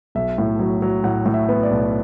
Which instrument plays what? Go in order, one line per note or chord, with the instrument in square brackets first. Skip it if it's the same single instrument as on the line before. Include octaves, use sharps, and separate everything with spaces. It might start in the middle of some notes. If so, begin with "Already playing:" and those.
[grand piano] B1 E5
A2
F#3
F#3
A2 F#5
A2
E5
B3
D5
B1